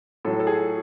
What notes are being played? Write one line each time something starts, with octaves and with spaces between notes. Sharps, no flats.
A2 F#3 A4
A4
G#4